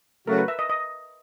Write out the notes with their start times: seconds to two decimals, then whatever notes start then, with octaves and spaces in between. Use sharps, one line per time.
0.27 C#3 F#3 A3 C#4 F#4 A#4
0.38 B4
0.48 E5
0.59 D#5
0.69 D#5